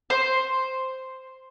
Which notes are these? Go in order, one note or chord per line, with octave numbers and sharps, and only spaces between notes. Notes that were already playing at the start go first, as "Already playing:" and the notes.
C5